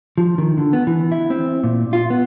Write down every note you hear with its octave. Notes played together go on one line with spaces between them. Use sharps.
F3
D#3
D3
B3
E3
E4
C4
A#2
F4
B3